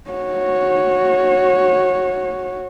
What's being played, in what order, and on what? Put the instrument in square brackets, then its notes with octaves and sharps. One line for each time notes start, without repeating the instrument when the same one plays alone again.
[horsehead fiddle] F#4 C#5